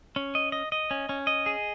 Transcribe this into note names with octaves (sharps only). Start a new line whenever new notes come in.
C#4
D#5
D#5
D#5
C#4
C#4
D#5
G#4